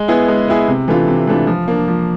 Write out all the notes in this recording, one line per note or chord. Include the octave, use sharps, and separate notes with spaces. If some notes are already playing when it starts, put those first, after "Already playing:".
Already playing: G#3
B3 E4 G#4
G#3
B3 E4 G#4
C3
E3 A3 D4 F4
C3
E3 A3 D4 F4
F3
A#3 D4
F3